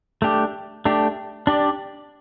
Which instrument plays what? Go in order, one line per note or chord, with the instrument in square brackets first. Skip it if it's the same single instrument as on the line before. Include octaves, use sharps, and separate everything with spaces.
[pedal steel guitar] A3 D4 G4
A3 D4 G4
D4 G4 D5